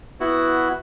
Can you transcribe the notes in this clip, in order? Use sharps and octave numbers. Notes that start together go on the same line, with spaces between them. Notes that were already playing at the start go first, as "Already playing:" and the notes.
B3 E4 F#4